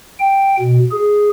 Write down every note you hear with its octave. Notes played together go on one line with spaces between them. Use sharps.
G5
B2
G#4